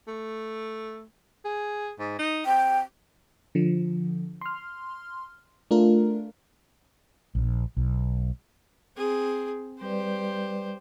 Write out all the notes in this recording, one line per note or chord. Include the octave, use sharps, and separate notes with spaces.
A3
G#4
G#2
D#4
C4 G5
D3 F3
C6 F6
A3 D4 F4 A#4
A#1
B1
C4 G#4
G3 G4 B4 C5 D5